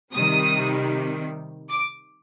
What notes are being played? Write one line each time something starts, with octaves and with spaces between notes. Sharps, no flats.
C3 D#3 G3 D#6
D6